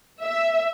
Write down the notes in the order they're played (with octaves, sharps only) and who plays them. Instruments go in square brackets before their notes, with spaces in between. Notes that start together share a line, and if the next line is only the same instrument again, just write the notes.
[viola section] E5